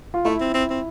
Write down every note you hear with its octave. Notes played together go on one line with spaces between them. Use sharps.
F4
A3 E4
C4
C4
C4